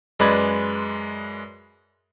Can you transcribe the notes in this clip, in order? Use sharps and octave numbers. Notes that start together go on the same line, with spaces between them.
F#2 G#3 B4 D5 B5 G#6